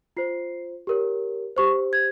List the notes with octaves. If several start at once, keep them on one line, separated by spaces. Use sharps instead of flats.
F4 C5 C7
G4 A#4 C#5
G4 C5 C#6
G#6